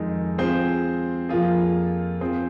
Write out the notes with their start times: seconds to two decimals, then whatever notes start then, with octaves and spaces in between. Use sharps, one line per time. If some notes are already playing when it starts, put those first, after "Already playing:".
Already playing: F2 D#3 G#3 D#4
0.38 F3 C4 G#4 C5
1.29 F2 F3 A#3 F4 G#4
2.21 F3 C4 G#4 C5